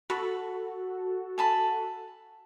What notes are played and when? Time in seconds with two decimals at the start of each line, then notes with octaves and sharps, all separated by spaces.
0.10 F#4 A4 B5
1.38 G#5 A5 B5